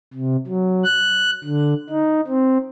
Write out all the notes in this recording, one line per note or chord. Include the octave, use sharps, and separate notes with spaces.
C3
F#3
F#6
D3
D#4
C4